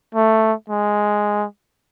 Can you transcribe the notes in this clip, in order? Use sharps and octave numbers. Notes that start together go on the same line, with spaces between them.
A3
G#3